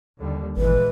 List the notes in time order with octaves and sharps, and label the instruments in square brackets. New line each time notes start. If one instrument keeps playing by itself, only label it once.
[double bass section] D#2 D3 G3
[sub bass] G#1 [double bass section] A#2 E3 G#3 [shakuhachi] B4